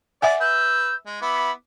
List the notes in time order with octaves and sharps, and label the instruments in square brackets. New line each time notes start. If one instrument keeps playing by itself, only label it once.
[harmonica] D5 [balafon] E5 F#5 G#5
[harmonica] B4 E6 [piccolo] G6
[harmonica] G#3
[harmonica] B3 E4 D6 [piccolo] B5